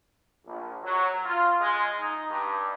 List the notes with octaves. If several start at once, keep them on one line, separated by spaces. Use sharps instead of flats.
A#1
F#3
F4
G#3
D#4
G2